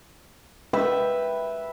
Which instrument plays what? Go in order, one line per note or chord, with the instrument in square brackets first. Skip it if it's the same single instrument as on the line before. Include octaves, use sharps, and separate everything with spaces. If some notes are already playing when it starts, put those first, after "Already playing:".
[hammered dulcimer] B4 E5 G5